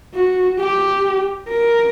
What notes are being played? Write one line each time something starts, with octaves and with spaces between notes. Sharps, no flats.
F#4
G4
A#4